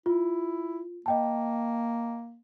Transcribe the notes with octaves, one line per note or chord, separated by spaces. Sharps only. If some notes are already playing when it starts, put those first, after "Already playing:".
E4 F4
A#3 D#5 G5 A5